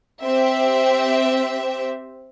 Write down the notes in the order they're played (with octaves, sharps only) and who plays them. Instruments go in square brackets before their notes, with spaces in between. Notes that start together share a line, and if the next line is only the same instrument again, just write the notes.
[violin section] C4 G4 E5